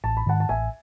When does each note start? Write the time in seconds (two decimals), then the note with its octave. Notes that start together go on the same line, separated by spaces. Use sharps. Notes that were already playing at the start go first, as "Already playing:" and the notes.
0.04 A1 A5
0.17 B5
0.26 G#2 D#3 F#5 A5
0.40 A5
0.49 A1 E5 G#5